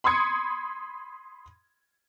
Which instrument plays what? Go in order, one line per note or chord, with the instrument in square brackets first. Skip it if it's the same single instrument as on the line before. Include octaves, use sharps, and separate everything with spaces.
[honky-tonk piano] B5 C6 D#6 G#6 C#7